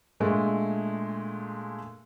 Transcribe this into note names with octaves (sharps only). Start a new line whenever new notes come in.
A#2 G#3 A3 D4